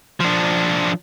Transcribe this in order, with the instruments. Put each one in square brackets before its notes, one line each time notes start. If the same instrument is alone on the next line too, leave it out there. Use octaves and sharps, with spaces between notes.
[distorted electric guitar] F3 D4